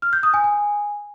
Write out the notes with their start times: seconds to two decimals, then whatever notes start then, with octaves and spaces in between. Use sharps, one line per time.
0.02 F6
0.13 G6
0.23 D#6
0.34 G#5
0.44 G#5